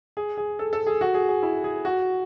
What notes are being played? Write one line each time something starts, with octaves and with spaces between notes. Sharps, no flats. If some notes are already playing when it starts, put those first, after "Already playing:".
G#4
G#4
A4
A4
G#4
F#4
G#4
G#4
E4
G#4
F#4